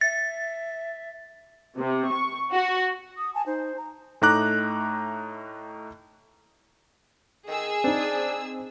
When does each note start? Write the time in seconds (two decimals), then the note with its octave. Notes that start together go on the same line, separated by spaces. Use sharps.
0.01 E5 A6
1.79 C3
2.12 C#6
2.52 F#4
3.18 D#6
3.35 G#5 A5
3.46 D#4 C5
3.77 A#5
4.22 A2 A3 D#4 A#5 D6 F#6
7.48 D#3 G#4 E6
7.84 C4 D4 D#4